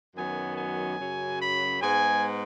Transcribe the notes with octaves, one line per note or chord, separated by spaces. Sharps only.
F#2 D#3 F#3 B3 G#5
G#5
F#2 C#3 F#3
B5
G#2 G#3 B3 G#5